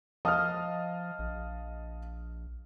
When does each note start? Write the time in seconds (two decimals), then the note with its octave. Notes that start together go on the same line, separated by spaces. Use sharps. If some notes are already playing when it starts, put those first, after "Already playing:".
0.25 F3 D#5 F5 A5 D#6 F6
1.19 A#1